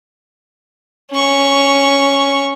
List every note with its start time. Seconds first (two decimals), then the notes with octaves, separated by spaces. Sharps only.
1.11 C#4 C#6